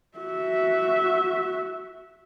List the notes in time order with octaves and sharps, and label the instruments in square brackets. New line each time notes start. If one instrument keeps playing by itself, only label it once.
[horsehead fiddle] F#4 E5